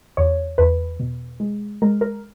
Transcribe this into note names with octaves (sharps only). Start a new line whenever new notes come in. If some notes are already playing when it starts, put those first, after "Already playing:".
E2 C#5
E2 B4
B2
G#3
G#3 A#4
A#4